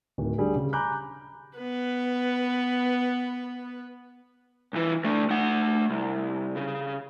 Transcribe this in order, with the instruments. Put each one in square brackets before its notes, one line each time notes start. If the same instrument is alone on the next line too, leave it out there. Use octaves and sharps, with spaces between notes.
[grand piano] D1 D#3
D3 G3 G#4
C#3
G#5 A#5 B5 D6 F#6 G6
[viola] B3 B4
[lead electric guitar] C2 E3
D3 A3
A3 F#5
C2
C#3